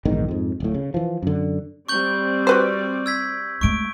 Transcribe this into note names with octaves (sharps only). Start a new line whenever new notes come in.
A#1 E2 G#2 D#3
F2 G#2
D1 A2
C#3
E3 F3
F#2 D3
G3 C4 D5 C#6 G6 F#7
F#4 B4 C5
E6 G#6 B6
G#3 A3 C#6 D7